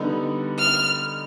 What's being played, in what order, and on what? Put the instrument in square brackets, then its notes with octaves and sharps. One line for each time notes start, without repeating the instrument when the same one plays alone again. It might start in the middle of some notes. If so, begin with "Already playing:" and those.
Already playing: [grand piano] D3 G3 B3 D#4
[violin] F6